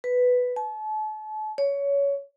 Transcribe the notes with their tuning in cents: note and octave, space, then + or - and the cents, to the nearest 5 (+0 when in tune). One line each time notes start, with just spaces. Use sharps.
B4 +5
A5 -40
C#5 +20